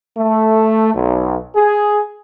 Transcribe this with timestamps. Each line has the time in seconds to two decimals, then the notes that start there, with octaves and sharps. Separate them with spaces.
0.17 A3
0.94 B1
1.56 G#4